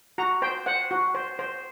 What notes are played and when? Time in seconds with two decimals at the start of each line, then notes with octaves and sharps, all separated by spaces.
0.18 F#4 A#5
0.42 C5 G5
0.66 C5 F#5
0.91 F#4
1.15 C5
1.39 C5